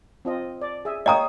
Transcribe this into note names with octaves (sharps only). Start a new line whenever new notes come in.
C4 F4 D#5
D5
G#4 E5
A#3 C#5 D#5 F5 G5 A#5 D#6